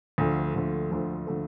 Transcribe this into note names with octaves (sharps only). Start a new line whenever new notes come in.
D2 D3 F3 A3
D2 D3 F3 A3
D2 D3 F3 A3
D3 F3 A3